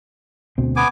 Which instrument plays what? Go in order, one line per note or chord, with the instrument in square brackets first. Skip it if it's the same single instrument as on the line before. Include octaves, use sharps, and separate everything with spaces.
[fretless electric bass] D2 B2 C4
[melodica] B3 G#5 D6